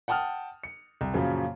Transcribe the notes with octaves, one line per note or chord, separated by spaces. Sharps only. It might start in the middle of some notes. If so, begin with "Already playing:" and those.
F#5 G5 A5 D#6 F6
C#7
C2
F#2 A#2 C#3 F3 F#3